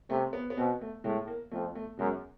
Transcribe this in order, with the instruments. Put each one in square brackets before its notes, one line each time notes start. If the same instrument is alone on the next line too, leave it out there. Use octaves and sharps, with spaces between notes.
[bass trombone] C3 [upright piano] A3
[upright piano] B3
B3
[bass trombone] B2 [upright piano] C4
[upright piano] A3
[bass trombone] A2 [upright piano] G#3
[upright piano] A#3
[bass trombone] F2 [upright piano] A3
[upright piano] A3
[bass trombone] F#2 [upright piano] G#3